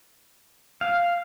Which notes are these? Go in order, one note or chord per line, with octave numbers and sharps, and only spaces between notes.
F5